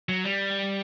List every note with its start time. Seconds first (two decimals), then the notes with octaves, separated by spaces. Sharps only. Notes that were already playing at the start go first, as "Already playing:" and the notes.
0.09 F#3
0.24 G3